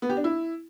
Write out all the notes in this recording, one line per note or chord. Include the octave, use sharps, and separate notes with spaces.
B3
G4
D4
E4